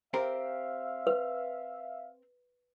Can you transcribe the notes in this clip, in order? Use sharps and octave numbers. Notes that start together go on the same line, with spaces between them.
C4 G4 A#4 E5 F5
B4